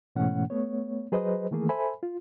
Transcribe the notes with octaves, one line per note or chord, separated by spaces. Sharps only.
G#2 B2 E3 A3 C#4 F#5
A3 B3 C#5
F#3 G#4 B4 C5 D#5
D#3 E3 A3 A#3 G#4
A4 C5 E5 G#5 B5
F4